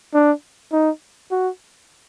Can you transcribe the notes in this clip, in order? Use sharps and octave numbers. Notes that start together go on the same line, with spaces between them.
D4
D#4
F#4